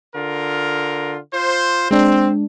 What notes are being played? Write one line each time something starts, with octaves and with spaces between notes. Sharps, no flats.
D3 F4 A#4
F4 C5
G#3 C4 D4